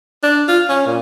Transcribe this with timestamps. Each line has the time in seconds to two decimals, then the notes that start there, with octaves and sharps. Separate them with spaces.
0.23 D4
0.48 F4
0.69 C#4
0.86 A#2